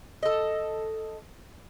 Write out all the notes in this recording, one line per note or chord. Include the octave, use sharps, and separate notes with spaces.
A4 D#5